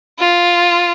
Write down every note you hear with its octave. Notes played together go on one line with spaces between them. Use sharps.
F4